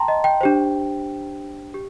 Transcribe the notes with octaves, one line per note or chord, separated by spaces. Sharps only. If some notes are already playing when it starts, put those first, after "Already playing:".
Already playing: G5 A5 A#5 C6
D#5
G5
D4 G4 C5
G4